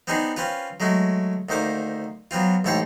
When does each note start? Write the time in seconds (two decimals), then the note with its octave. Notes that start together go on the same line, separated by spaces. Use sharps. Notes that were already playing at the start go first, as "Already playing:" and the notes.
0.07 B3 C4 D4 D#4 G#4
0.37 C4 C#4 F4 B4
0.80 F#3 G#3 A3 F#4
1.49 D2 D#3 A#3 C5 D6
2.31 F#3 B3 C4 F4
2.64 A1 G#2 A4 C#5 G5 C6